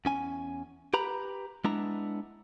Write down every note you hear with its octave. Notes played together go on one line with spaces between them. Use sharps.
E2 C#4 G#5
G4 B4 A#5 B5
G#3 B3 D4 E4 A#5